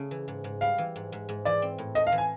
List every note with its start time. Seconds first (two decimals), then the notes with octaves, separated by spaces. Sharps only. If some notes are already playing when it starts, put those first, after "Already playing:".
Already playing: C#3 A3 C#4
0.11 E3
0.28 G#2
0.44 G#2
0.61 G3 F5
0.78 E3
0.96 G#2
1.12 G#2
1.29 G#2
1.45 E3 D5
1.62 C4
1.78 A2
1.95 A3 D#5
2.07 F5
2.12 E3
2.18 G#5